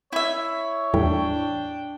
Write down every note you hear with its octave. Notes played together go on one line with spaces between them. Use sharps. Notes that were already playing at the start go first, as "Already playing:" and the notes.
E4 C#5 E5
E2 A2 G3 D4 G5